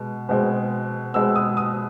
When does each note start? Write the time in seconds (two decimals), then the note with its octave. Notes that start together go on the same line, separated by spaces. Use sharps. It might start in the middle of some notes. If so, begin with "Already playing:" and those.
Already playing: B2 G#3
0.29 B2 G#3 C4
1.14 B2 G#3 C4 E6
1.36 D#6
1.57 D#6